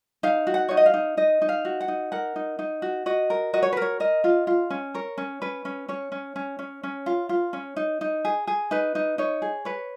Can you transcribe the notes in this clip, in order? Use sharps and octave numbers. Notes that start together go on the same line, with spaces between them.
D#4 F5
F#4
F#5
D#4 C#5
D#5
F5
D#4
D#4 D#5
D#4
F5
F#4
F#5
D#4
A#4 F#5
D#4
D#4
F#4
F#4 D#5
A#4
F#4 D#5
C#5
B4
A#4 C#5
A#4 D#5
F4
F4
C#4
A#4 C#5
C#4
C#4 B4
C#4
C#4 C#5
C#4
C#4
C#4
C#4
F4
F4
C#4
D#4
D#4
G#4
G#4
D#4 B4
D#4
D#4 C#5
G#4
B4 C#5